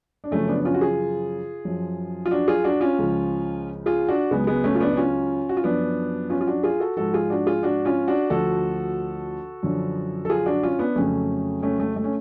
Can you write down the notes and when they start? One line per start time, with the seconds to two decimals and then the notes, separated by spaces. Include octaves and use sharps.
0.24 D4
0.31 F#2 C#3 F3 A3 C#4
0.48 B3 D4
0.60 D4
0.65 C#4 F4
0.74 F#4
0.81 F4 G#4
1.65 F#2 F3
2.26 F4
2.31 D4 F#4
2.48 F4 G#4
2.64 D4 F#4
2.81 C#4 F4
2.98 C#2 C#3 F3
3.86 F4 G#4
4.08 D4 F#4
4.31 C#2 C#3 F#3 G#3 B3
4.47 G#3 B3
4.64 A3 C#4
4.75 F4
4.80 B3 D4
4.93 D4
4.97 C#4 F4
5.49 F#4
5.57 F4
5.64 F#2 F3 B3 D4
6.30 C#4 F4
6.41 F4
6.47 D4 F#4
6.63 F4 G#4
6.80 F#4 A4
6.97 G#2 F3 F#4 A4
7.14 F4 G#4
7.30 D4 F#4
7.46 F4 G#4
7.63 D4 F#4
7.85 C#4 F4
8.08 D4 F#4
8.30 D2 D3 F3 F#4 A4
9.63 F#2 D3 F3
10.25 A4
10.30 F4 G#4
10.46 D4 F#4
10.63 C#4 F4
10.79 B3 D4
10.96 F2 C#3 F#3 A3 C#4
11.63 A3 C#4
11.80 A3
11.96 A3
12.04 C#4